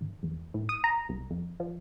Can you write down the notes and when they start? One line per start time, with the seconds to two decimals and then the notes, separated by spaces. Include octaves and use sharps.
0.01 G#1
0.23 E2
0.54 A2
0.69 D#6
0.84 A#5
1.09 C2
1.30 F2
1.60 F3